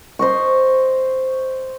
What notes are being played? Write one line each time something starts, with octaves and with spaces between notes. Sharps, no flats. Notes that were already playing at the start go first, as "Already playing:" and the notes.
C5 D#5 C#6